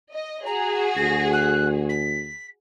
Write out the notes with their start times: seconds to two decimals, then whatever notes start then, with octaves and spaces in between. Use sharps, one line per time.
0.12 D#5
0.46 F#4 G#4 A#5
0.96 D2 A#6
1.33 F#6
1.89 B6